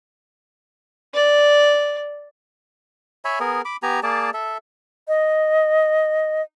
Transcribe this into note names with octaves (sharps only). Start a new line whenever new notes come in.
D5
C#5 E5 G#5 B5
B3 G#4 A#4
B5 D6
B3 G4 G#5 A#5
A#3 G#4 D5 A5
A4 E5
D#5